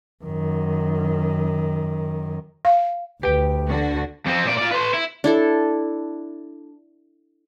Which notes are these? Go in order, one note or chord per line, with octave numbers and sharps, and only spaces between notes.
F#2 D#3
F5
D2 G4 B4 G5
D3 F#4
F2 C4
A#2 D5
F4 D5
B4 C6
E4
D4 E4 A4